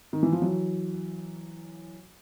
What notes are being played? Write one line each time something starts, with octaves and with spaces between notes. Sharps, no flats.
D#3
E3
F3
E3 F#3